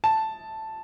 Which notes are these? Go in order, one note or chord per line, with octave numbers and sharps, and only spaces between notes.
A5